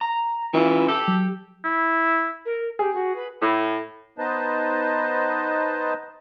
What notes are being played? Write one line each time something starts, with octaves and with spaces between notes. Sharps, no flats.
A#5
E3 C#4 E4 F4
G4 A4 G5
F#3
E4
A#4
G4 G#4
F#4
B4
A2
B3 D#4 B4 C5 D#5 A5